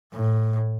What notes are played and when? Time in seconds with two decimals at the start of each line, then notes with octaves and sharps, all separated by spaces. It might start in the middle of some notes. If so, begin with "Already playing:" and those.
0.14 A2